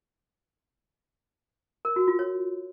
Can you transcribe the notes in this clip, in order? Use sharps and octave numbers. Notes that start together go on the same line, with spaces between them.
A#4
F#4
F4
C#5